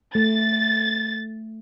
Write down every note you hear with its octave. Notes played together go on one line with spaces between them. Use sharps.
A3 A6